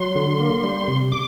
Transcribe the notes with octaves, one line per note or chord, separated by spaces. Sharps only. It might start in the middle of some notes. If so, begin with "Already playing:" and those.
Already playing: F#3 C6
D3
A#3
G3
C3
D6